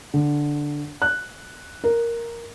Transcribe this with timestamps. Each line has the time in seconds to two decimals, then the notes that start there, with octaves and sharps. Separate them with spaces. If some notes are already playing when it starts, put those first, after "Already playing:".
0.14 D3
1.02 F#6
1.84 A#4